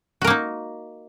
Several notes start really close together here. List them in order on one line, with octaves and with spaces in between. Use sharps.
F#4 A#4 A#3 D#4